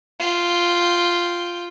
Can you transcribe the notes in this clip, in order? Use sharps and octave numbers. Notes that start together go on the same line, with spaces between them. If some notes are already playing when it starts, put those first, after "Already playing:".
F4 G5